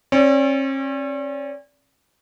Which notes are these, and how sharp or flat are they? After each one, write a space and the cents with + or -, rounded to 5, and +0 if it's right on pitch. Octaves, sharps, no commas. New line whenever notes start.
C#4 -45 D5 -35